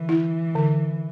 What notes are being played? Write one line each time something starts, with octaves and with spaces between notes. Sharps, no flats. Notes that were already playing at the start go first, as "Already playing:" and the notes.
Already playing: D3 E3
E4
D3